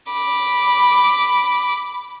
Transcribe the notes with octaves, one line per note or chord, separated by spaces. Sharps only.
B5 D6